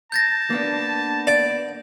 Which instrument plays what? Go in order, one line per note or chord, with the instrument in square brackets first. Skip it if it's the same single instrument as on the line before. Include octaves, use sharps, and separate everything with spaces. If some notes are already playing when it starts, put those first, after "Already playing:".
[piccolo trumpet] A5 [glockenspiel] G6 A6 A#6
[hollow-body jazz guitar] A#3 B3 D4
[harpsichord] D5